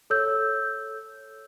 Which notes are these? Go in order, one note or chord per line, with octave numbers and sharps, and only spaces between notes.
A4 C#5 E6 G6